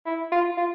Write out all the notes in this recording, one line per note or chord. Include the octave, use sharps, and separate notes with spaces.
E4
F4
F4